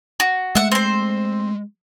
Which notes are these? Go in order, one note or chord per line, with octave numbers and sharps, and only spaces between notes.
F#4
G#3 A3 E5 F#5
C4 C5